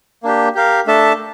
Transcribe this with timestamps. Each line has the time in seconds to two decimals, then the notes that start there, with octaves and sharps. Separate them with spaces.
0.23 A#3 D4 G4
0.55 G4 A#4 F5
0.86 A3 D4 A4 E5 A5